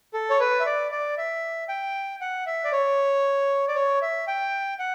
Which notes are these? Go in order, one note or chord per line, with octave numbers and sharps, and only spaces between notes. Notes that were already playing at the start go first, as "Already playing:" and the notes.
A4
C#5
B4
E5
D5
D5
E5
G5
F#5
E5
D5
C#5
D5
C#5
E5
G5
F#5